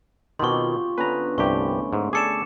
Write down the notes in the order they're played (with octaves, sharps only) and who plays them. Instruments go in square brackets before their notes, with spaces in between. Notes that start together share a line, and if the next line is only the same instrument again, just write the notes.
[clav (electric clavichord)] B2 D#3 [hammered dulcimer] C4 F4 G4 [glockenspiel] C6 C#6
[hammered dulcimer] D3 B3 C#4 [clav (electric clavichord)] B4 A#5
[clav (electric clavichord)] C2 G2 G4 [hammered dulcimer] A3 [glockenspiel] C#6
[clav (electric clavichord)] G#2
[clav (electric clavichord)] G#4 A4 D5 [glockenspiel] D6 C#7 E7